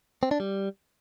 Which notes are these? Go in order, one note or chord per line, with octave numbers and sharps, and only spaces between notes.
C4
D4
G3